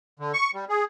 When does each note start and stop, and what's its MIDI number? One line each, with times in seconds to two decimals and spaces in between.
0.19 0.32 50
0.34 0.51 85
0.54 0.65 55
0.69 0.84 68